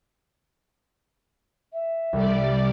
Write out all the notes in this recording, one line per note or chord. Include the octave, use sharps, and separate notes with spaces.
E5
C2 G3 D5